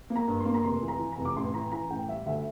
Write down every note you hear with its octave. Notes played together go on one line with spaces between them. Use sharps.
A#3
A#5
G2
A#3 C6
A#5
F1 C6
E3
A#5
E3
A#5
F1
D6
A1 C6
E3 A#5
E3 A#5
A1 G5
G3 E5
D2 E5